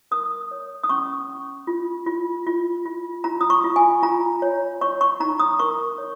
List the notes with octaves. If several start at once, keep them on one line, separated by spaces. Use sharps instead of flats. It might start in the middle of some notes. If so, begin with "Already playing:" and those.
A#4 D#6
C#5
D#6
C#4 C#6
C#4
F4
F4
F4
F4
F4 A#5
D#6
C#6
F4
G#5
F4 A#5
C#5
C#5 C#6
C#6
D#4 A#5
D#6
A#4 C#6
C#5